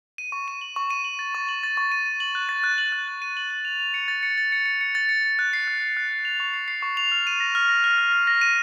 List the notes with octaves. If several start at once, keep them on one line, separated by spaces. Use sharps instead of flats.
D#7
C#6
D#7
F#7
C#6
D#7
F#7
A6
C#6
F#7
A6
C#6
D#7
D#7
F#7
F#6
A6
F#6
F#7
F#6
F#6
D#7
F#7
F#7
F7
F7
C#7
A6
C#7
A6
C#7
C#7
C#7
A6
C#7
C#7
F#6
C7
F#6
C7
F#6
C7
F7
C#6
C7
C7
C#6
F7
F6
D#7
A#6
F6
A#6
F6
F6
A#6
A#6
D#7